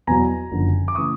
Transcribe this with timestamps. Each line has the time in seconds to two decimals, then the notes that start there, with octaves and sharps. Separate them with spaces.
0.07 E2 B2 F#3 G#5 A#5
0.51 F#1 F#2 D3 F3
0.88 D6
0.95 C#3 E3 A3 C#6 D#6